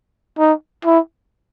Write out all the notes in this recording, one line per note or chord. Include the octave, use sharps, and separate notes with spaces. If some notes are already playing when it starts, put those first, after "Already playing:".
D#4
E4